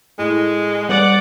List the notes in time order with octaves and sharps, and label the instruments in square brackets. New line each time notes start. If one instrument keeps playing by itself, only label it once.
[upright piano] A2 [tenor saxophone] G#3
[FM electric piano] G3 [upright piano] B3 [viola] D5 F#5